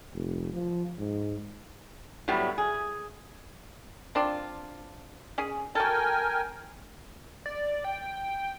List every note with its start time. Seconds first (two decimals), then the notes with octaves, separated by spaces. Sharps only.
0.14 F1
0.53 F3
0.98 G#2
2.28 A2 F#3 G3 B3
2.58 G#4
4.15 C4 D4 F4
5.38 C#4 G#4
5.75 F#4 A4 A#4 G5 G#5
7.46 D5
7.84 G5